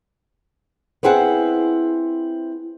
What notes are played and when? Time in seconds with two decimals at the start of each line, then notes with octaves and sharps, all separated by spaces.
1.03 B3 C4 E4 G#4 F#5